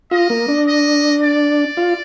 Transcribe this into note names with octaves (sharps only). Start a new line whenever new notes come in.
F4 D#5
A#3
D4
D#5
D5
F4